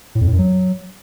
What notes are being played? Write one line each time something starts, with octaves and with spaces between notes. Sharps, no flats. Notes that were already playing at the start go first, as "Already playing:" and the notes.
A2
F2
A2
F#2
F#3